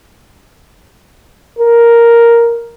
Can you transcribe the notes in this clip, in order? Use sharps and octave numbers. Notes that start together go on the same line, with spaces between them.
A#4